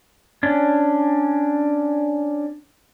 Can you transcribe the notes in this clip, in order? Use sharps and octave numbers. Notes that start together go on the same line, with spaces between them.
C#4 D4